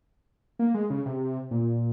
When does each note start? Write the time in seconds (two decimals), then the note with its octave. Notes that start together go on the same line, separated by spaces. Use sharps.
0.59 A#3
0.74 G#3
0.90 C#3
1.06 C3
1.51 A#2